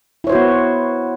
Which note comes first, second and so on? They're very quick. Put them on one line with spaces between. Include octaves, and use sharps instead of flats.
E4 C#5 C5 F#4 B3